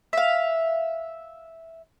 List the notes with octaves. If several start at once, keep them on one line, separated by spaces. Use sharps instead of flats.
E5 F5